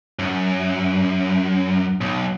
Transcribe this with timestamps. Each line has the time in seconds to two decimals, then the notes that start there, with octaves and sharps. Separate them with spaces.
0.19 F#2
2.01 B1